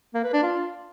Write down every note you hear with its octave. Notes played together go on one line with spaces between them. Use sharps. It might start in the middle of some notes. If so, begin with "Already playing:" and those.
A#3
B4
D4
F4